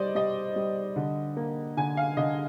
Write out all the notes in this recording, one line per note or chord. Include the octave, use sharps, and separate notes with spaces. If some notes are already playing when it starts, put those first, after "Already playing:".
Already playing: G3 C5 D5 D#5
G3 D#5
G3
D3
A#3
D3 G#5
F5
D3 D#5